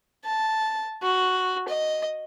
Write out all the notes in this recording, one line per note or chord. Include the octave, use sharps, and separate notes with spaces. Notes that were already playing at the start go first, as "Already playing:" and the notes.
A5
F#4
D#5